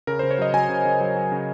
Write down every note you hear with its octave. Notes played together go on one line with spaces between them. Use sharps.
C#3 A#4
C#3 C5
C#5
F#3 D#5
F#3 G#5
C#3
C#3
F#3
F#3
C#3